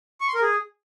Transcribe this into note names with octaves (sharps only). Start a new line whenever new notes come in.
C#6
C6
A#4
G#4